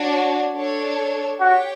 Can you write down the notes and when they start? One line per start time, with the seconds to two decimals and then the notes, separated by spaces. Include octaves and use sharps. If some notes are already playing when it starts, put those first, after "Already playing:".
Already playing: D4 F#4 C#5
0.55 D4 A4 C#5
1.40 F#4 G4 C#5 G5